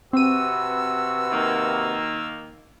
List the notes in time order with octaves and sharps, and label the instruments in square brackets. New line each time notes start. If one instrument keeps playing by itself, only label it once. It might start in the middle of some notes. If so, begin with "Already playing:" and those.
[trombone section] C3 F#4 B4 [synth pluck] C4 D#7 [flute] E6
[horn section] D#3 A#3